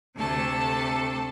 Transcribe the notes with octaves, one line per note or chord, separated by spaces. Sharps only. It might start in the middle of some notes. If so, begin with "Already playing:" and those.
D2 C3 A3 A4 A5